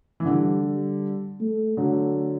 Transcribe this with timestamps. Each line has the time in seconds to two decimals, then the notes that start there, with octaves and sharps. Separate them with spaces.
0.20 E3
0.25 D3 G3
0.63 G3
1.40 A3
1.77 D3 F#3 A3